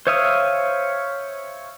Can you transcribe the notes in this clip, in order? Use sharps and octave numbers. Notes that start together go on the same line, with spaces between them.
C5 C#5 E5 F5 D#6